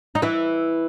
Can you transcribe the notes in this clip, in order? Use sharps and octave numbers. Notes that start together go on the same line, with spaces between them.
D#4
E3 E4